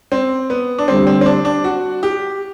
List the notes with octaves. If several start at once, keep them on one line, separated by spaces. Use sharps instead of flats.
C4
B3
D4
D2 D3 G3 C4
C4
C4
D4
D4
F#4
G4